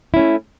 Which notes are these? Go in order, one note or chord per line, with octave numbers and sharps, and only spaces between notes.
A3 C#4 E4